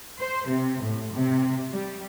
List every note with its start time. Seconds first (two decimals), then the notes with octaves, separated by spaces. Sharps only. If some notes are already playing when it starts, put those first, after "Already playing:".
0.19 C5
0.47 C3
0.83 A2
1.13 C3
1.72 G3